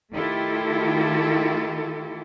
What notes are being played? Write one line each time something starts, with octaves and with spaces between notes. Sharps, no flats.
D#3 A3 E4 F4 G4 A4